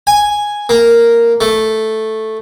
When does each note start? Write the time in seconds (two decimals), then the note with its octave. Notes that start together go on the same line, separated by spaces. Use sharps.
0.07 G#5
0.69 A#3
1.41 A3